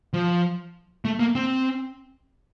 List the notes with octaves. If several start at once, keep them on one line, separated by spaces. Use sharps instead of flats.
F3
A3
A#3
C4